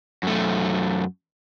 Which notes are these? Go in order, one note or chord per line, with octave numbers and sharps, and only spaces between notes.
F#2 A3